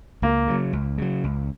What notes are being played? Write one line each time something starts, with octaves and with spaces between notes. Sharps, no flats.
C#2 A#3
C#3 F#3
C#2
C#3 F#3
C#2